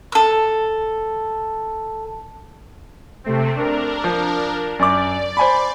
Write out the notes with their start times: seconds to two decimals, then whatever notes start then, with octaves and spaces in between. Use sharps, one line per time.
0.12 A4 E6
3.24 C3 A3 C4
3.56 D4 A#4
4.04 F3
4.79 F#2 D5 D6
5.37 C5 G#5 B5